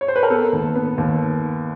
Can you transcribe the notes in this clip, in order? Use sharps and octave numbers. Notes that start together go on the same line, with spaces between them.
C#5
C5
B4
A#4
B3 A4
D#2
B3
D#2